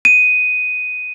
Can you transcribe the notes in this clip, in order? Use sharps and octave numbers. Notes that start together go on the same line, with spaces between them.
D#7